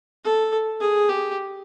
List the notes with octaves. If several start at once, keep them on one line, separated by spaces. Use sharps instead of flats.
A4
G#4
G4